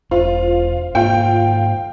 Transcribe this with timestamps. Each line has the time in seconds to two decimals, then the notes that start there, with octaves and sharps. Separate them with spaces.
0.11 E1 F4 C5
0.95 G#2 A#3 F4 G5